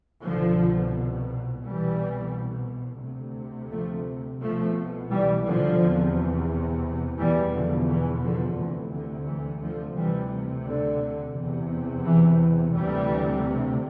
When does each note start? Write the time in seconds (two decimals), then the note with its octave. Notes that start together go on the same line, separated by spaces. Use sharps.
0.24 C2 B2 D3 F3
1.63 C2 B2 E3 G3
3.02 D2 C3
3.71 F3 A3
4.40 C2 B2 F3 A3
5.10 E3 G3
5.45 D3 F3
5.79 E2 C3
7.18 E2 B2 E3 G3
7.53 D3 F3
7.88 E3
8.23 D3 F3
8.58 D2 C3 E3
8.92 D3
9.27 E3
9.62 D3 F3
9.96 D2 C3 E3 G3
10.66 D3
11.35 E2 C3
12.05 E3
12.74 D2 C3 E3 G3